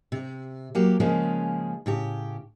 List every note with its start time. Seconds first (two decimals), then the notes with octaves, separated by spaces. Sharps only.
0.12 C3
0.75 F#3 A#3 G4
1.00 C#3 F3 G#3 A#3 C#4 G#4
1.86 A2 C#3 G4